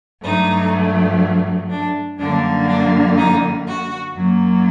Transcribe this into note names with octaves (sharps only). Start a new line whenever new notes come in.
G2 F#3 A3 D#4
D4
F#2 D3 G3 A#3 D4
D4
D#4
F#4
F#2 F#3 A#3